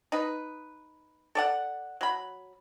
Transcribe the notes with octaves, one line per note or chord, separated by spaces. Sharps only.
D#4 B4
A4 D5 F#5
F#3 B5